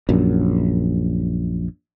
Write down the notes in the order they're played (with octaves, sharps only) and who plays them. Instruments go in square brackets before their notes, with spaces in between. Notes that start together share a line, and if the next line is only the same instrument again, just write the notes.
[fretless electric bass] A#1 F#2